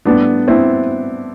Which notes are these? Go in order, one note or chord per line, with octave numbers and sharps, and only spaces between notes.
A2 G3 B3 D4
C4 E4